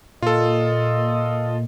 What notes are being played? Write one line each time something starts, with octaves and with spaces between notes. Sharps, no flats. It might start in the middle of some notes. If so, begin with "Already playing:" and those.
A#2 F4 A4 D#5